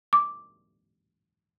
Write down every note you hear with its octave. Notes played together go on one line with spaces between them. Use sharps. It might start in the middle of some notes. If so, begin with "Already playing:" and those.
D6